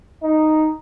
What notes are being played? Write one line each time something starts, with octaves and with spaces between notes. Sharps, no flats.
D#4